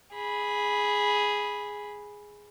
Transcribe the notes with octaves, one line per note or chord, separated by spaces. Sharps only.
G#4 B5